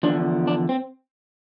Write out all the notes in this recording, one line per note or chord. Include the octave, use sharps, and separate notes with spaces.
E2 D3 F3 D4
D4
C4